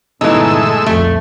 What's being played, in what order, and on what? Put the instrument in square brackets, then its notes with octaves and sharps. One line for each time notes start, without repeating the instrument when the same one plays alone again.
[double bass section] G1 A#2 [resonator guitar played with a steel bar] E3 D#4 [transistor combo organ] G#3 A3 E6
[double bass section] C2 F2 A#2 [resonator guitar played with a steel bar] A3